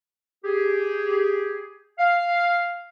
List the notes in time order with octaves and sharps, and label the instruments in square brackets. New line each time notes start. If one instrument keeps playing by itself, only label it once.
[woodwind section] G4 G#4
F5